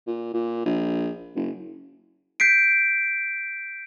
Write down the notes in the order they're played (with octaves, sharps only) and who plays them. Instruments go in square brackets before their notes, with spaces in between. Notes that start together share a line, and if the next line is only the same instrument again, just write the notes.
[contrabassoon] A#2
A#2
A#1
F#1
[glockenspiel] G6 B6 C7 D7